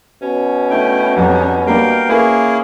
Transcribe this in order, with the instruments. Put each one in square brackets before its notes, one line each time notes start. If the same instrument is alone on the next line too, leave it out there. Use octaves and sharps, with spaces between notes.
[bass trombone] B2 [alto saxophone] C#4
[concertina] A3 E4 G5 [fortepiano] D4
[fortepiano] F2 F#3 G3 [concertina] B3 D4 D#4
[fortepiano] G3 A#3 D4 [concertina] A#4 F5 G5
[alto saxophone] A#3 [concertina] C#4 E4 G#4 [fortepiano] A#4 B4